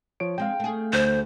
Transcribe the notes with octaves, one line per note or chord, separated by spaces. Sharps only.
F3 C#5 D7
G#3 C4 F5 G5
A3 G#4
D2 C5